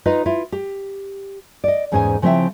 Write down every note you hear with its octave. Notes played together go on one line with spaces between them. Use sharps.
D#4 F4 B4 D#5
E4 F4
G4
D5 D#5
E2 G#2 C#4 G#4 C5 G#5
C#3 F3 C4 E4 E5 G5